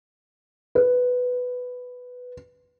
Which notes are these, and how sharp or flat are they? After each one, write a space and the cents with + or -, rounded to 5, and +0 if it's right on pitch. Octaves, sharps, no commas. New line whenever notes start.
B4 +5